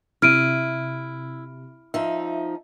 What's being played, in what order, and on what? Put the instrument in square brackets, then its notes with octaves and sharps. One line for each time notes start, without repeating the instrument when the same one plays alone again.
[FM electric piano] C3 [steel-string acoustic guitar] E4 [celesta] F6 D7 D#7
[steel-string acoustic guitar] F3 D#4 [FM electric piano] E5